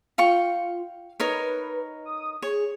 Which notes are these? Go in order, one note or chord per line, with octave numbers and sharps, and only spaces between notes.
F4 F5 G5 C#6
D#4 A#4 B4 C#5
D#6
G#4 C#5